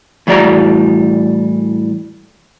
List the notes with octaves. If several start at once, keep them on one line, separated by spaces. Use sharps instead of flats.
A2 E3 G3 F#4 D5 A#5